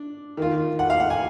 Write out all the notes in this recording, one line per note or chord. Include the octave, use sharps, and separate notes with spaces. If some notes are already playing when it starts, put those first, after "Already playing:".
Already playing: D4
D#3 A#3 F4
F#5
F5
F#5
G#5